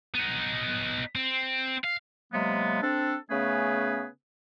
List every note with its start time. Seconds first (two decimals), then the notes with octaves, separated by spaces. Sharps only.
0.15 B3 D#4
1.15 C4
1.84 F5
2.33 C3 F#3 G#3 A#3 B3
2.82 C4 D4 A4
3.30 C#3 A3 B3 C#4 G#4 B4